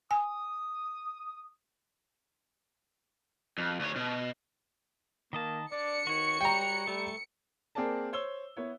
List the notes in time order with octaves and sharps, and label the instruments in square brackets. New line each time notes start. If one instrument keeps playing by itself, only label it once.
[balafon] G#5 [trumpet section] D#6
[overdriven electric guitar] F2
D2 C#5
B2
[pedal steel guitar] D#3 D#5 A5 [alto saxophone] A#3
[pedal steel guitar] D4 [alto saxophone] D5 [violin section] C#7
[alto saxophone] D#3 [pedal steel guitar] F#4 C#5
[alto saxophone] G3 [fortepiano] G5 A#5
[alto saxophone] G3 [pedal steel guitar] A3
[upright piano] A#3 C4 G#4 A#4 D5 A5
C5 C#5 E6 G7
B3 E4 C#5